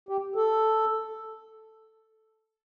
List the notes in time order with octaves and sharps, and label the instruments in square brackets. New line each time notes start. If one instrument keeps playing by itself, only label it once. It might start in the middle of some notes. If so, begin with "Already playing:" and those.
[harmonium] G4
A4